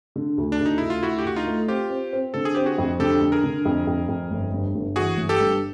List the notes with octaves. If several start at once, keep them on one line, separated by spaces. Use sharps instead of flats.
D3
D2
D4
D2
D#4
D2 E4
F4
D2 E4 F#4
G4
D2 F#4
D#4 F4
A3
C4 F4 G4
C4
C4
D3 A4
G#4
C4 G4
F#4 G#4
F2
D3 G4 A4
D3
G#4 A#4
D3
F2
F2
F2
G1
G2
G1
E3 F#4 G#4
G1
G4 A4
G2